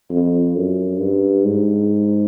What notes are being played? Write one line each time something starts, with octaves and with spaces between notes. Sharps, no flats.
F2
F#2
G2
G#2